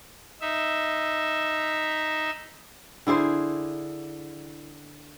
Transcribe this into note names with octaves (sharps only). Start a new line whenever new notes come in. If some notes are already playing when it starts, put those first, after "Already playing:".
D#4 E5
D3 E4 G#4 C5